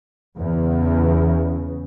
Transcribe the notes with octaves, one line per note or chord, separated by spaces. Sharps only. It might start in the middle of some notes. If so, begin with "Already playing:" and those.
E2 C#3